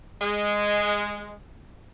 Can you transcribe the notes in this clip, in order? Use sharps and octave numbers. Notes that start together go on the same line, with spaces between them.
G#3